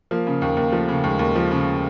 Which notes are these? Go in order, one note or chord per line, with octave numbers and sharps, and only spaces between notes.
F3 A#3
C#3
D#2 A#3
D#2
F3 A3
C#3
D#2 G#3
D#2
F3
C#3